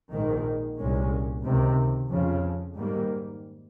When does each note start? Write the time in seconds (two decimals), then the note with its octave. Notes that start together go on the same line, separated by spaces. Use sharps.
0.11 A#1 G#2 D#3
0.77 C2 A#2 G#3 C#4
1.43 C#2 C3 D#3
2.09 F2 C#3 F3
2.75 G#2 D#3 G3 A#3